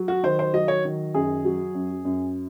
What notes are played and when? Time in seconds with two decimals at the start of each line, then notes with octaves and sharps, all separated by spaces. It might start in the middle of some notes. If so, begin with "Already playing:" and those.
Already playing: F#3
0.08 F#4
0.23 D#3 C5
0.39 C5
0.54 F#3 D#5
0.68 C#5
0.85 D#3
1.15 F#2 G#4
1.45 F#3
1.74 F#2
2.05 F#2